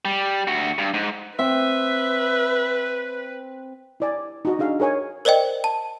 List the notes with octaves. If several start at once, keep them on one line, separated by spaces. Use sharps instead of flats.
G3
D2 F#4
G2
G#2
C4 B4 E5
E4 D5 G#5
D#4 F#4 D#5
D4 D#4 G#4 F5
G#4 A#4 C#5 G#5
A#4 C5 D5 D#5 G5
A5